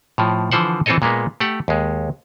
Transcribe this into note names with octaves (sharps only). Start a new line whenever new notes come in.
A2 F3
D3 E3 F3 C5 F#5
E3 C4 F4 A4 C#5 D#5
A#2 G#3 A#3 B3
A3 G4 F#5
D#2 G#3